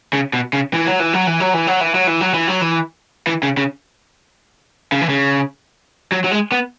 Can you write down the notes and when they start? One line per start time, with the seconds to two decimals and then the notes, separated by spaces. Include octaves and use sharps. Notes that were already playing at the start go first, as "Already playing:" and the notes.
0.13 C#3
0.33 B2
0.53 C#3
0.73 E3
0.87 F#3
1.00 E3
1.13 F#3
1.27 E3
1.40 F#3
1.54 E3
1.67 F#3
1.81 E3
1.95 F#3
2.07 E3
2.21 F#3
2.34 E3
2.48 F#3
2.61 E3
3.27 E3
3.43 C#3
3.57 C#3
4.92 C#3
5.01 E3
5.09 C#3
6.12 F#3
6.24 F#3
6.31 G#3
6.52 B3